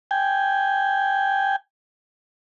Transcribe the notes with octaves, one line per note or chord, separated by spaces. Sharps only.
G5 G#5